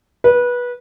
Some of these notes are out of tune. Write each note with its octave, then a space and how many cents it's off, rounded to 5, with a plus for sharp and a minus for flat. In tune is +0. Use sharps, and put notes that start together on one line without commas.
B4 -20